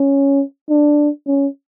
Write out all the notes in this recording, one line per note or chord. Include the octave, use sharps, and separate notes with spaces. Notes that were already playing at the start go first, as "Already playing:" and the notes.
Already playing: C#4
D4
C#4